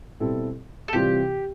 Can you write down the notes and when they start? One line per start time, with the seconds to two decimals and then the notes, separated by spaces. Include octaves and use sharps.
0.20 B2 G3 C4 E4 A4
0.88 A4
0.93 C3 E3 G3 C4 F4 G4